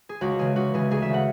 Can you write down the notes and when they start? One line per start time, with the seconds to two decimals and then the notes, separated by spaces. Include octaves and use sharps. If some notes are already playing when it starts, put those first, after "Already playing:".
0.09 G#4
0.21 C#2 F#4
0.39 C#3 E3 G#4
0.56 C#2 F#4
0.74 C#3 E3 G#4
0.91 D2 G#4
1.02 E5
1.09 C#3 E3 F#5